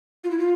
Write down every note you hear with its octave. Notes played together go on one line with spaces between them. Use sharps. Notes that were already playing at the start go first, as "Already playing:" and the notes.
F4
E4
F4